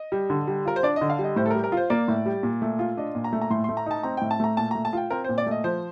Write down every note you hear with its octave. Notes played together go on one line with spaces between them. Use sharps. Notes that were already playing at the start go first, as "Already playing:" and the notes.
Already playing: D#5
G3
D3
G3
F4 A#4
C5
D4 D5
D#5
D3
F5
G3
D#5
A2 C5
A4
A#4
G3
A#4
F4 C5
A#3 D5
A2
G3
A#2
A3
F4
D4 D#5
A#2
A#5
A3
A#5
A2 C6
C6
A3
A#5
D#4 A5
C4 A#5
A2 G5
A5
A3 A#5
A#2 A5
A3 A#5
A5
F4 G5
C4 A#4
C5
A#2
D5
A3 D#5
F3 C5